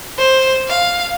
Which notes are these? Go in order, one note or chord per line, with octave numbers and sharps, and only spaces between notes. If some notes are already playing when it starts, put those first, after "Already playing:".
C5
F5